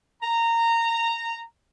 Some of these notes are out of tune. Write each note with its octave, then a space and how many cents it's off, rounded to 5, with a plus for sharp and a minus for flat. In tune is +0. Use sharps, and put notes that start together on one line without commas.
A#5 -15